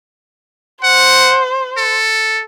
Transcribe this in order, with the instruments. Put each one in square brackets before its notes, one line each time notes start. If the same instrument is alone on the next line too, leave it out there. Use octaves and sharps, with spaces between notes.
[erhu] C5 [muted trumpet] F#5
[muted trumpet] A4